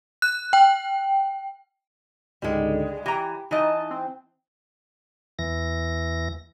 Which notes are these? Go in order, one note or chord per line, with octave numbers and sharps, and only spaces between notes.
F#6
G5
C#2 G#2 D3 G3 G#3
E3 G4 A#5
E3 D#4 D#5 A5
C4
E2 E3 A#6